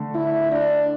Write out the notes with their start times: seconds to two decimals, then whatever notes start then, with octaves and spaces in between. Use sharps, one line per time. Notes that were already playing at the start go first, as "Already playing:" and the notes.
Already playing: D3 A3
0.15 E4
0.52 D4